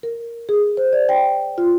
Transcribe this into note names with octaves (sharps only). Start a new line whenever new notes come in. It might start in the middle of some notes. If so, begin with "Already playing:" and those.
A#4
G#4
C5
D5
G5
F4